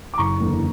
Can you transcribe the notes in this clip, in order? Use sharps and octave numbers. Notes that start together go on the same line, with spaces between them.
D6
F#1 A#5 C#6
E2 D3 A#3